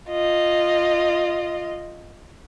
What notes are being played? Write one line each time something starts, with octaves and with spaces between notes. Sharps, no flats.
F4 D#5